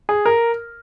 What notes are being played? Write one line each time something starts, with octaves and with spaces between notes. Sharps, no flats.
G#4
A#4